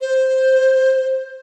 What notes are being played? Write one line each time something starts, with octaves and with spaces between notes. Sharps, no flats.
C5